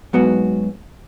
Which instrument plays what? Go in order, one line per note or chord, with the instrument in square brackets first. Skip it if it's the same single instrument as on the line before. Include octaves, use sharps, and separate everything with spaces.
[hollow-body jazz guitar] G#2 F#3 B3 F#4